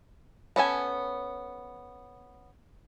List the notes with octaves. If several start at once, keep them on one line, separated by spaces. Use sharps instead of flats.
B3 C#4 A4 G#5